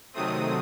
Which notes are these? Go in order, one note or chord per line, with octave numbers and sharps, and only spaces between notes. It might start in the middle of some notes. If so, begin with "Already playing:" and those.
C3 D#3 F#3 A3 C4 D#6